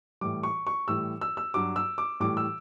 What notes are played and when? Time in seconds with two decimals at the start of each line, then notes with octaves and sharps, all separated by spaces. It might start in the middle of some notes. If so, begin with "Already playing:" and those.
0.21 A2 E3 G3 D6
0.43 C#6
0.67 C#6
0.88 A2 E3 G3 E6
1.21 E6
1.37 E6
1.54 G2 F#3 D6
1.76 E6
1.98 D6
2.20 A2 E3 G3 D6
2.37 E6